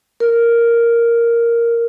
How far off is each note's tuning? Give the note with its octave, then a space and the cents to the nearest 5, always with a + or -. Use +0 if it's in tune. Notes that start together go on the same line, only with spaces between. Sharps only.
A#4 +0